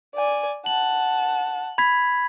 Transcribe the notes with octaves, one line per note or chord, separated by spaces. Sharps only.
D5 G#5
F#5 A5 F#7
B5 G#6 B6